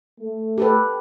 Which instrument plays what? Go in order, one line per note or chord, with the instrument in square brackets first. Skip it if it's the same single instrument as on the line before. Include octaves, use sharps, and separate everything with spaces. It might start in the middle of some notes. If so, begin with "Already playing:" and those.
[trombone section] A3
[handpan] G4 A4 B4